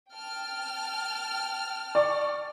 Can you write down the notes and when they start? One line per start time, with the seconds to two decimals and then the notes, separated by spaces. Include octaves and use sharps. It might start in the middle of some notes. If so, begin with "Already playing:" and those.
0.12 G5 A5 F6
1.95 D5 C#6